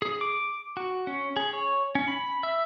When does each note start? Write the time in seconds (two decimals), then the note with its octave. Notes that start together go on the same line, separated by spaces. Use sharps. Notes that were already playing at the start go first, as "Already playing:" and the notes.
0.02 G#4
0.21 D6
0.77 F#4
1.07 C#4
1.36 G#4
1.53 C#5
1.95 C#4
2.08 B5
2.43 E5